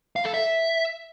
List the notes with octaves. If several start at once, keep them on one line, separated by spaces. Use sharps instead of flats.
F5
A4
E5